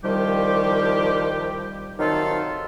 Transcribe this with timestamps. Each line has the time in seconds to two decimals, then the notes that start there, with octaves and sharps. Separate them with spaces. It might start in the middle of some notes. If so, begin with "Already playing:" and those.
0.04 C2 D#3 F3 G3 G4
1.98 C3 D#3 F#3 D#4 F4 A4